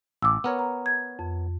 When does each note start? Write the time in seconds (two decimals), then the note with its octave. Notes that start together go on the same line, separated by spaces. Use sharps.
0.22 A1 D6 E6
0.44 B3 A#4 C#5
0.59 A#5
0.86 G#6
1.19 F2